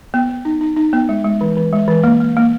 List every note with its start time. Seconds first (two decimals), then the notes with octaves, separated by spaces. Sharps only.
0.14 B3
0.29 B3
0.45 D#4
0.61 D#4
0.76 D#4
0.93 B3
1.09 G#3
1.25 G#3
1.41 E3
1.56 E3
1.73 G#3
1.88 E3
2.04 A#3
2.20 A#3
2.37 A#3